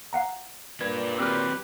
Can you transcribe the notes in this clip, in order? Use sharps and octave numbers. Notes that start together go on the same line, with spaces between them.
F5 F#5 A#5
A#2 D4 B4 G#6
F#3 C4 G4 B4 E6 F6